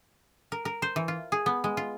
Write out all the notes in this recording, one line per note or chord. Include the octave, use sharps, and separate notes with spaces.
A#4
A#4
C5
E3
F4
G#4
B3
G#3
F4